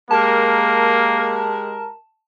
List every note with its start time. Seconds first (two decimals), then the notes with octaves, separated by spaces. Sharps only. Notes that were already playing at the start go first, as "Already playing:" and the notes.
0.11 G#3 A#3 G4 A#4 A5